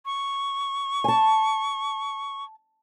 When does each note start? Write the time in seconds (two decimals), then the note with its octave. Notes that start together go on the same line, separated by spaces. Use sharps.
0.06 C#6
1.04 G#5 A5